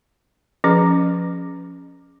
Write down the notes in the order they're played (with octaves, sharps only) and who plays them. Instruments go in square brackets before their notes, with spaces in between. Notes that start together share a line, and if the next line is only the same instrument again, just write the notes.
[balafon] F3 C#4 G#4 B4